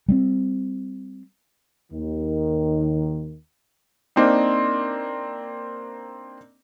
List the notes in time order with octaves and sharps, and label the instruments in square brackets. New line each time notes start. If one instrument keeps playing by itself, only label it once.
[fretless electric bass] G3 G#3 C4
[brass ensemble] D#2 D#3
[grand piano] A#3 C4 D4 D#4